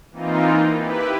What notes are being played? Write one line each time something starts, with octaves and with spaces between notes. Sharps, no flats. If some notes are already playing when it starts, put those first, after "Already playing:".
E3 A#3 C4 D#4 F4
E4 G4 B4